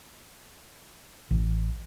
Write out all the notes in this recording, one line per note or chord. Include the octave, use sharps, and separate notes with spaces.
A1